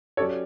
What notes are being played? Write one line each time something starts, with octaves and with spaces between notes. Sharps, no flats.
F#3 C#4 G4 A4 C#5 D5